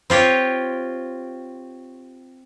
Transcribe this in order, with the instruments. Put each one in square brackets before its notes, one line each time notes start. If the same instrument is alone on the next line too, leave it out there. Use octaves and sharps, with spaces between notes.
[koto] C4 F4 G4 C#5